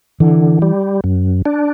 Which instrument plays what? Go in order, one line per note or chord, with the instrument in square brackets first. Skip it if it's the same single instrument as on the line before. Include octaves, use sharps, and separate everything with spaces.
[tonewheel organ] D3 [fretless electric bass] E3
[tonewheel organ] G3
F#2
D4